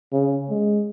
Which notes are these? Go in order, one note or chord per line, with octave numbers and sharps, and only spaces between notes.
C#3
G#3